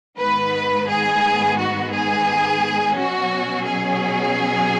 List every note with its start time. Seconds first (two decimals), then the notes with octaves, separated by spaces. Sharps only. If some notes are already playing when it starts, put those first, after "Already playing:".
0.19 G#2 D#3 B3 B4
0.88 G#4
1.57 F#4
1.92 G#4
2.96 B2 F#3 C#4 F#4
3.65 G#4